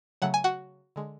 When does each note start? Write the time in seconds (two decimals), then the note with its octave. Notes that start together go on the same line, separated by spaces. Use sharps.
0.22 C#3 F#3 A3 F#5
0.34 G#5
0.44 F#4 F#5
0.96 D3 G#3